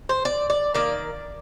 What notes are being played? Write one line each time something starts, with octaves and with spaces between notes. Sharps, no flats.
C5
D5
D5
D#3 A#3 D5